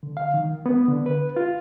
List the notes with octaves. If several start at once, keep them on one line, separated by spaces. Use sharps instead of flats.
D3
F5
D#3
B3
D3
B4
F4